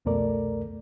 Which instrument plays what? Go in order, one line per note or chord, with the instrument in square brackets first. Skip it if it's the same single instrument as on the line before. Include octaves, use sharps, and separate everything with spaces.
[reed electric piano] C2 F2 B2 A3 A#4 D5